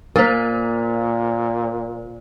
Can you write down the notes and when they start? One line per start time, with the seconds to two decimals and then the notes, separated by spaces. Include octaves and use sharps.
0.16 A#2 A#3 A#4 C5